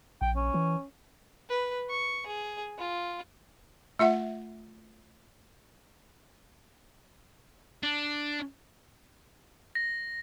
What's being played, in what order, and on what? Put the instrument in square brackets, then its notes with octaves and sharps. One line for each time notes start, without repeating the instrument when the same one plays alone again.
[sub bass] A#1 [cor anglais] G5
[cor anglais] C#4
[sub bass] E3
[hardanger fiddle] B4
C#6
G#4
F4
[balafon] A3 F4 E5 F#5
[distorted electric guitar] D4
[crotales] A#6